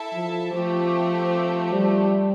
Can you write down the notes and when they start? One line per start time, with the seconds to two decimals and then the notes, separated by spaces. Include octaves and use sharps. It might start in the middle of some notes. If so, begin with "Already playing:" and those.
Already playing: E4 A4 E5 A5
0.14 F3
0.53 F3 A3 C4 G4
1.73 G3